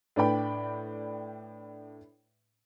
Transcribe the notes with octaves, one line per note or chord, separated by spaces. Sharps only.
A2 D4 B4 D5 G5 B5